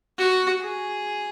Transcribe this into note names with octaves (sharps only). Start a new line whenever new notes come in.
F#4
G#4